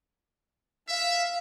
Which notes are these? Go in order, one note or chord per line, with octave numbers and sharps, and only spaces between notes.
E5 F5